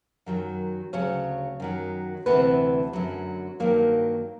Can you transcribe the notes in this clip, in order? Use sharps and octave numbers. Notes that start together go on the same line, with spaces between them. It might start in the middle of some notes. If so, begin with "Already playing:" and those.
F#2 D#3 F#3
D2 C#3 F#3 C#4 C#5
F#2 D#3 F#3
D2 C3 E3 B3 B4
F#2 D3 F#3
G2 D#3 F#3 A#3 A#4